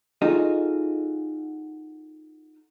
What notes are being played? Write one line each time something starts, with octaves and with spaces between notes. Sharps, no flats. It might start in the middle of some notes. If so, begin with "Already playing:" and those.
D#4 F4 F#4 G#4 A4 D#5